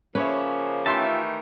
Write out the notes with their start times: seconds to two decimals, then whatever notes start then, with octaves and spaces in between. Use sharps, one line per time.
0.15 C#3 F3 A#3 C#4 B4 C#5 E5
0.86 D#3 E3 A3 F4 G4 E5 A5 C6